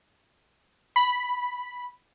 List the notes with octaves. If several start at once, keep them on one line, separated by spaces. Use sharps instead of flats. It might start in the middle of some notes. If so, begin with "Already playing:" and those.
B5